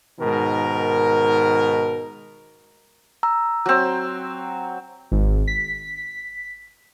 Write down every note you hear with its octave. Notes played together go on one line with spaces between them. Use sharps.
G#2 B2 D#3 A#4
A#5 E6
F#3 C4
G#1
B6